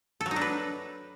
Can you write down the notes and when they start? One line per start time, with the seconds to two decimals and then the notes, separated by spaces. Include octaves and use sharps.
0.21 A4
0.26 F#3
0.31 D#4
0.36 D4
0.41 B4